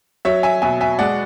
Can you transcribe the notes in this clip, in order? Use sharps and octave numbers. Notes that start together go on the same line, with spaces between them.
F#3 C#5 E5
E5 G#5
B2 E5 G#5
E5 G#5
G#3 D5 F#5